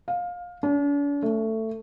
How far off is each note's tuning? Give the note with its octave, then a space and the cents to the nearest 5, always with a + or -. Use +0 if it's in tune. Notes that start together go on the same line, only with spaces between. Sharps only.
F5 +20
D4 -45
A3 +15